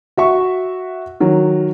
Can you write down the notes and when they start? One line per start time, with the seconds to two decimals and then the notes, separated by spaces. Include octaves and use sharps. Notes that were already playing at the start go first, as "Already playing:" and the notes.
0.17 F#4 E5 C#6
1.20 D#3 F#3